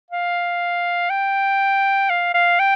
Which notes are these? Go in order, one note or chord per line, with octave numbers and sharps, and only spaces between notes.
F5
G5
F5
F5
G5